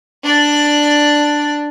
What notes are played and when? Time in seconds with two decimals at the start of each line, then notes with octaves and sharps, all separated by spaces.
0.23 D4 D5